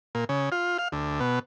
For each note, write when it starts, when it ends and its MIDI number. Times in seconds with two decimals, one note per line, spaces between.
0.15 0.25 46
0.29 0.50 49
0.52 0.77 65
0.78 0.88 77
0.92 1.20 38
1.20 1.39 47